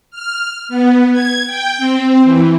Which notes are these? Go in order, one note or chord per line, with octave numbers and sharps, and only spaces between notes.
F6
B3
G#6
G5
C4
E3